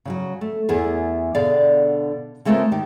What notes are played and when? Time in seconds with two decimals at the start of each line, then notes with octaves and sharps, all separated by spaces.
0.05 C#3 E3 F#3
0.41 A3
0.69 E2 B3 E4 G#4
1.35 B2 D3 G#4 D5 F5
2.45 C#3 G#3 A3 C4 F4 A#4
2.72 D#3 G4